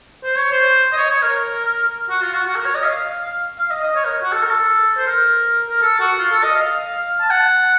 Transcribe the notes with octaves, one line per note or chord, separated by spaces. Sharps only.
C5
C#5
C5
D#5
C#5
C#5
A#4
F#4
F4
F#4
F#4
A#4
C#5
D#5
F5
F5
D#5
D#5
C#5
A#4
F#4
A4
A#4
A4
C5
A#4
A#4
A4
F#4
F4
A4
D#5
F5
A5
F#5